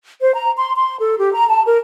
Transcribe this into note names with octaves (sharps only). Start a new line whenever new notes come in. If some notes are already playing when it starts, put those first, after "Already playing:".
C5
A#5
C6
C6
A4
G4
A#5
A5
A#4